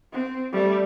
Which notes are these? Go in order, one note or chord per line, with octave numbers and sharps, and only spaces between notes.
C4
G3 A3